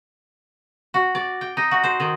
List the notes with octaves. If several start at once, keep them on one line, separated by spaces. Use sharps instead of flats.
F#4
D5
G5
D#4
F#4
C5
D#3